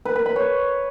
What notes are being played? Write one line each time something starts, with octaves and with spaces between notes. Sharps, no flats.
B4
B4
B5
C#5